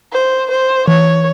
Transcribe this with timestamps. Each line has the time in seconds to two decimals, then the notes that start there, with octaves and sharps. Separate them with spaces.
0.12 C5
0.50 C5
0.87 E3 C#5